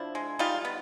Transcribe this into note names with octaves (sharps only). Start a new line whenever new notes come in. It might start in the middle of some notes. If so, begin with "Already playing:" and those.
Already playing: F3 D4 E4
G#3
G3 D#4 F4
B3